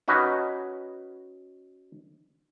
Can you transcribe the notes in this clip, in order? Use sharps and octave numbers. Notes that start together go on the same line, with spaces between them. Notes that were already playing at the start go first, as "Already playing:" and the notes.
C#4 D#4 F#4 B4